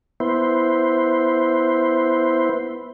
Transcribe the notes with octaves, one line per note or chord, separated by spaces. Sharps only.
B3 E4 C5